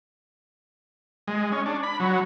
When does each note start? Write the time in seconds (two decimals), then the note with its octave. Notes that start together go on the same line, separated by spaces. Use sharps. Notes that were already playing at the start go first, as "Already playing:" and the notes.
1.28 G#3
1.52 C#4
1.66 D4
1.83 B5
2.00 F#3